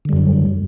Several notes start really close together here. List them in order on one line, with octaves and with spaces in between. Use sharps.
D3 G3 F#2 F#3